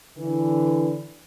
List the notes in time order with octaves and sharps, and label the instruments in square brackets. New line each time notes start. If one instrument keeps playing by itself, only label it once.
[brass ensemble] D3 E3